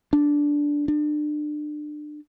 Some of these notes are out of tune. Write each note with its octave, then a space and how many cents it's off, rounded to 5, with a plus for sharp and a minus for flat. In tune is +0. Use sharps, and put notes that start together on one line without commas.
D4 -10
D4 +30